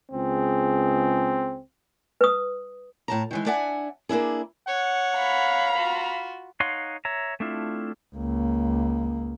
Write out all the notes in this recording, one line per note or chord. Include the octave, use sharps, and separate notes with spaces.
C#2 C4 G#4
B4 D#6
A2 A5 A#5
D#3 E3 G#3
D4 D5 E5 F#5 G#5
A#3 D4 E4 G#4
C#5 F#5
F5 A#5 B5
F4 F#4
D#4 C#5 F5 F#5 C6
C#5 E5 A#5
A3 C4 D4 E4 F4
C#2 A#3